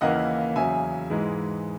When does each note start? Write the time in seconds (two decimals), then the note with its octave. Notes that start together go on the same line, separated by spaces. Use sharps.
0.01 D#2 C#3 E3 A#3 D#5 F#5
0.56 E2 C#3 F#3 E5 G#5
1.10 G#2 E3 G#3